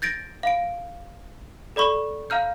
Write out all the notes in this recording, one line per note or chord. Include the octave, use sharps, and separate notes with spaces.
G6 A6 A#6 D7
F5 D7
A4 D5 B5 C#6
F5 A#5 F6 G6